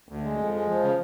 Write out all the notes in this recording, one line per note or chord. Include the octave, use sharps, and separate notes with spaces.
D2
G#3
F2
G#3
F3
C#3